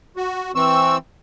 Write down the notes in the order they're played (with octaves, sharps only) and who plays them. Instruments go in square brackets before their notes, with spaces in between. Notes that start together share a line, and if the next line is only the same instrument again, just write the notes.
[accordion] F#4
[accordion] E3 C4 E6 [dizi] C#6